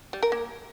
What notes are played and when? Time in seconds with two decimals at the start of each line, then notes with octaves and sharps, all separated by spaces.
0.13 G3
0.23 A#4
0.32 A#3